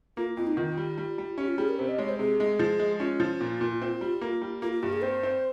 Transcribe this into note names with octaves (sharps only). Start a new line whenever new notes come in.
A#3 F4
F2 F4
D#4
D#3 F4
G3
G3
G3
C#4 G4
F4
G3 G#4
A#4
C3 C5
D#5
G#3 C#5
C5
C3 G#4
G#3
F3
G#3
C#4 F4
F3
A#2
A#2
C4
G3
A#3
G3
A#3 F4
F4
G2 G4
G#4
C4 C5
C4